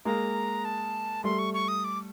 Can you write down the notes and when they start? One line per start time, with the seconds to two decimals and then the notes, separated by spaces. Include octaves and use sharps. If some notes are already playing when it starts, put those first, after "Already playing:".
0.05 G#3 A#3 A#5
0.65 A5
1.24 G3 A3 C6
1.39 C#6
1.54 C#6
1.68 D#6
1.84 D6